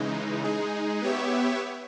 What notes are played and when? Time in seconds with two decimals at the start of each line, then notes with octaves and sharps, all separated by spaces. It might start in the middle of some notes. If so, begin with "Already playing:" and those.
Already playing: C#3 E3 G#3 D#4
0.44 G#3 D#4 G#4
1.02 B3 G4 C#5 E5